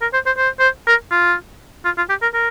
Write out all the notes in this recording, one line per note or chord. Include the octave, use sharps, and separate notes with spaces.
A#4
C5
C5
C5
C5
A#4
F4
F4
F4
G4
A#4
A#4